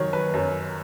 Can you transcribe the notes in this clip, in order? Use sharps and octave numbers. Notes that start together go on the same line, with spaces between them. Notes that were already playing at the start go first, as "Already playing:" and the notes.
Already playing: F#2 D#3 F#3 C#5
B4
F#2